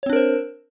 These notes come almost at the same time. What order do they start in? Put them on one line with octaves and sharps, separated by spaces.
C#5 C4 D4 A#4 C5